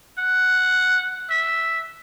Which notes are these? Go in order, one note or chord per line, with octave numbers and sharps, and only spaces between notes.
F#5
E5